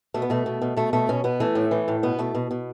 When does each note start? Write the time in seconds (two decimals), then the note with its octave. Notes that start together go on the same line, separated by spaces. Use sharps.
0.14 B2 A3
0.22 B3
0.30 B2 A3
0.46 B2
0.62 B2
0.76 B2 A3
0.93 B2 A3
1.09 B2 C#4
1.24 B2 B3
1.40 E3 A3
1.55 A2
1.71 E3
1.88 A2
2.03 B2 B3
2.19 B2 A3
2.35 B2
2.51 B2